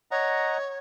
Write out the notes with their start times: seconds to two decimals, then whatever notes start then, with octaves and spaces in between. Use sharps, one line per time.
0.11 C#5 D#5 F#5 A#5